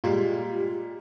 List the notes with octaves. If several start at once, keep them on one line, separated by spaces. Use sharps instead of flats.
A#2 G3 G#3 F4 G4